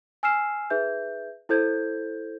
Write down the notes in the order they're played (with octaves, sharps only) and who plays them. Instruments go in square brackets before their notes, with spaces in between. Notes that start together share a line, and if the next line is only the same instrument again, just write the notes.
[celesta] G#5 E6 F6 C7 E7
D#4 G#4 B4 E5 G6
E4 A4 C5 G6 G#6